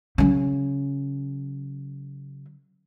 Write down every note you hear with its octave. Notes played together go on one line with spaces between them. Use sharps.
C#3 F#3